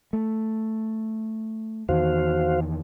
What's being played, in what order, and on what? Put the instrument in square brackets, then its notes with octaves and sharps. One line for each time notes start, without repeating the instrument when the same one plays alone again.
[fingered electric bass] A3
[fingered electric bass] E2 D#3 [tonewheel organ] F#4 C5 F5